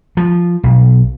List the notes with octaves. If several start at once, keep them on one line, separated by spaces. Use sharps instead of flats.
F3
B1